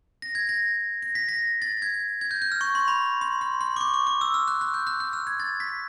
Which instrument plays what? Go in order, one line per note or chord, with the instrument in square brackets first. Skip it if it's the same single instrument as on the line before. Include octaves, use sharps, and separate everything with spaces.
[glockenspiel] A#6
G#6
A#6
A#6
B6
A#6
A6
G#6
G#6
G6
G6
F6
C#6
C6
B5
C6
C6
C6
D6
C#6
D6
D6
E6
F6
F#6
F#6
G6
F#6
F#6
F6
G#6
A6
B6